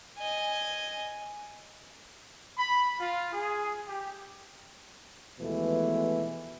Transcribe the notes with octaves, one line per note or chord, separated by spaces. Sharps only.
D#5 G#5
B5
F4
G#4
G4
D#2 B2 E3 F3 G#3 A3